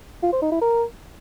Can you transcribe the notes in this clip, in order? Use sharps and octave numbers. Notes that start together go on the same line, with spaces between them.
F4
C5
D#4
E4
A#4